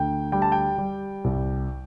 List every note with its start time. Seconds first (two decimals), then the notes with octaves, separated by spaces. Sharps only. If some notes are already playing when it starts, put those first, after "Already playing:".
Already playing: D2 G5
0.32 G3 G5
0.42 A5
0.52 G5
0.78 G3
1.24 C2